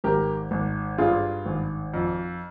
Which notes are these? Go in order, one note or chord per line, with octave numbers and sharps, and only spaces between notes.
G#1 G4 A#4
G#1
G2 F4 G#4
G#1
F2